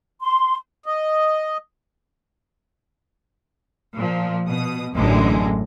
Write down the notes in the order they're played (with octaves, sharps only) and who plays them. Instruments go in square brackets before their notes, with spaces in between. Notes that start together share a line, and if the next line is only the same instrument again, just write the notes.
[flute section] C6
[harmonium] D#5
[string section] A#2 F3
B2 D#6
A1 F#2 A2 D3 G#3